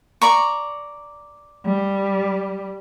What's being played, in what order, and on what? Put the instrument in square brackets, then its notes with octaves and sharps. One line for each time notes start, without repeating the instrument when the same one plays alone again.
[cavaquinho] D5 A#5 C#6
[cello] G3